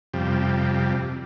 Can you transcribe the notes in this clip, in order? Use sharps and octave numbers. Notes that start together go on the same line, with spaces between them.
F2 C3 G3